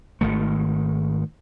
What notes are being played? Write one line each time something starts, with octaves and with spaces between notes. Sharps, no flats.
G#1 D#3 A3